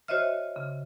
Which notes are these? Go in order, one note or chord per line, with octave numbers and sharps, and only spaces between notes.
F#4 C5 C#5 D#5 E5 F6
C#3